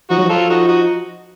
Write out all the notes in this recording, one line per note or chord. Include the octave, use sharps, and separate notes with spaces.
F3 D#4 F#4
F#3
F3 F4 A4
D#4 F#4
D#4 F#4